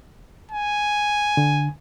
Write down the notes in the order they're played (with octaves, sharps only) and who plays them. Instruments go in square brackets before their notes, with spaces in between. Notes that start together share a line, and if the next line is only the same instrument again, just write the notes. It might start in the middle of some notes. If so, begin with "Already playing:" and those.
[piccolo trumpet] G#5
[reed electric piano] D3